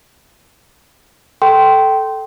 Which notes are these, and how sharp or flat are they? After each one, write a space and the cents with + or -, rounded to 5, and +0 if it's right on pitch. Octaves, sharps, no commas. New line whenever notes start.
A4 +0 G5 -15 C6 +0